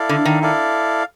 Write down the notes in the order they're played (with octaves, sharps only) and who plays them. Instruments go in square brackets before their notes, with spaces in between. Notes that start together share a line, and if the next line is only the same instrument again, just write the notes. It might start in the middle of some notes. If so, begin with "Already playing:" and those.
Already playing: [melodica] E4 A4 D5 F5
[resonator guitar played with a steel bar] D3
D#3
[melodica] E4 A4 D5 F5